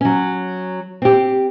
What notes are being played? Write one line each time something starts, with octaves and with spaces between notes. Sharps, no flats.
F#3 C#4
C4 G4